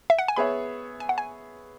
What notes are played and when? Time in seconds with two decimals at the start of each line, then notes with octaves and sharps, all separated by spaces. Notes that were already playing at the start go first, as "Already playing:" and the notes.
0.10 E5
0.19 F#5
0.28 G#5
0.36 B3 G#4 C#5 E5 B5
1.00 G#5
1.09 F#5
1.18 G#5